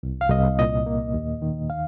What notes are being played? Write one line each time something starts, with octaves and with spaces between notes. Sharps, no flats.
C2
F5
C2 D#5
A#2 D#5
A#3
D#2
D#3
F5